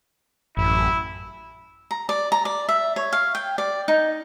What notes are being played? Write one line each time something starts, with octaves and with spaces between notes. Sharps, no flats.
A1 F#2 E4
A#5
D5
A#5
D5
E5
C#5
F5
G5
D5
D#4